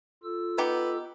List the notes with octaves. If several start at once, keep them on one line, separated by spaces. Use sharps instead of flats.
F4 A4 E6
B3 D#4 G4 B4